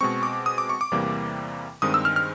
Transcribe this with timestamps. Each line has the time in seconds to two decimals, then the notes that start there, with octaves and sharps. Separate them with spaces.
0.01 B2 G#3 C4 C#6
0.23 D6
0.46 D#6
0.58 D6
0.69 C#6
0.81 D6
0.91 E2 C3 E3 G3 A#3
1.82 G2 D#3 G#3 C4 D#6
1.94 E6
2.05 F6
2.16 F6